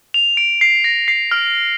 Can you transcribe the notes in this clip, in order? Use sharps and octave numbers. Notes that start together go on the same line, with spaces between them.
F7
D7
C7
A#6
C7
F6